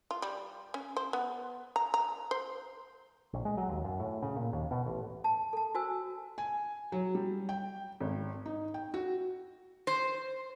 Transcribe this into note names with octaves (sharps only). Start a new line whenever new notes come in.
F4
G3
C#4
C5
B3
A#5
A#5
C5
A#1
G#3
F#3
D#2
F#2
A2
C#3
A#2
D#2
B2
A1
A5
A4 A5
F#4 C5 G#5 E6
G#5
F#3
G3
G5
G#1
D#4
G5
F#4
C5